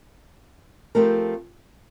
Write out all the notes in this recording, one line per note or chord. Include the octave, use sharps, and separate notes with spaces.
F3 A3 C4 G4 A#4